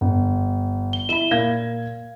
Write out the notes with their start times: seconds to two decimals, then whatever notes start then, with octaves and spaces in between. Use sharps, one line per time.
0.01 G1
0.93 G7
1.09 E4 B5 E7 G7
1.31 A#2 A#4 F5 G#6